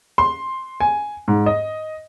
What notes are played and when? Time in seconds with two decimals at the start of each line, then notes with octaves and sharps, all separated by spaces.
0.18 C6
0.80 G#5
1.28 G#2
1.46 D#5